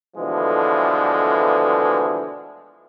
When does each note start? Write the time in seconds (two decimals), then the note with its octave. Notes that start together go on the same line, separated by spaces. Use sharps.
0.17 B2 D3 E3 F3 G#3 A3